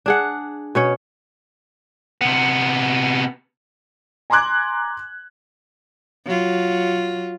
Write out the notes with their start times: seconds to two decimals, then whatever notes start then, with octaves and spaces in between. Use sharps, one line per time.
0.06 D4 G#4 F#5
0.75 B2 C#4 C#5
2.21 C3 B3
4.30 G#5 A#5 C6 D6 F#6 G#6
6.26 F#3 F4